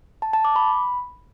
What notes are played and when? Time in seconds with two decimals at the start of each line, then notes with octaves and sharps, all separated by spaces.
0.22 A5
0.33 A5
0.45 D6
0.56 B5